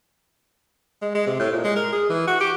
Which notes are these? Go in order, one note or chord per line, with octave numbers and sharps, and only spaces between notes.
G#3
G#3
C3
A2
A#2
G#3
A#4
G#4
E3
F#4
G4